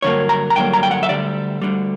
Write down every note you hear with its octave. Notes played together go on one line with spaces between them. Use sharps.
G2 D3 F#3 A#3 C#5
A#5
A#5
G2 D3 F#3 A#3 G5
A#5
G5
F#5
E5
D2 D3 G3 D5
D2 D3 G3